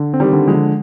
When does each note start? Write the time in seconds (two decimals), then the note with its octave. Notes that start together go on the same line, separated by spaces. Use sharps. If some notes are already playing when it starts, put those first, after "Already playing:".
Already playing: D3
0.14 C4
0.20 D#3 G3
0.33 D3
0.48 F3 G#3
0.54 D3